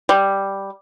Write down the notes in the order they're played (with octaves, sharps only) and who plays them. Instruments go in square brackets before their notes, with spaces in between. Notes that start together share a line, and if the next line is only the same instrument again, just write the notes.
[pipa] G3